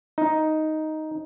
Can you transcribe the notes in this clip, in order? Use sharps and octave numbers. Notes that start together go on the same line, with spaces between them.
D#4